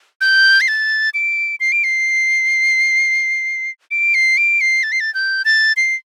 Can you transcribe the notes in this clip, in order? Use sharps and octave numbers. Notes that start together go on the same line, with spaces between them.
G6
C7
A6
D7
C7
D7
C7
D7
C7
D7
C7
A6
C7
A6
G6
A6
C7